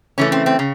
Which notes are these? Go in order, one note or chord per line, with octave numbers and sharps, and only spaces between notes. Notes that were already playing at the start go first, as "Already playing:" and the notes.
C#3 E3 A3 C#4
C4
C4
C#3